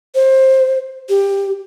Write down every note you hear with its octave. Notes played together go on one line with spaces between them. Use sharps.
C5
G4